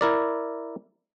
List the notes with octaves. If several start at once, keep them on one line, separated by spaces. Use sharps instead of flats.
E4 A#4 D5